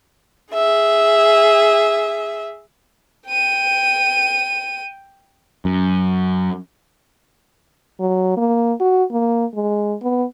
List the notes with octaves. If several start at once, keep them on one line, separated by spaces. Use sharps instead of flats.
G#4 E5
G5 D#7
F#2
F#3
A#3
F#4
A#3
G#3
B3